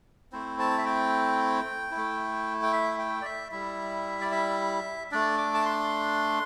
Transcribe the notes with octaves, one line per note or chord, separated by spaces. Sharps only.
A3 C4 E4 C5
A5
E5
G5
E4
A3
G5
E5
G5
D5
E5
G3 E4 E5
D5
E5
A3 D4 D5
D6
A5
C6